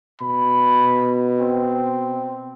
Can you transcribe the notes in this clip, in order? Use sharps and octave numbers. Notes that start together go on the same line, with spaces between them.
B2 B5
C4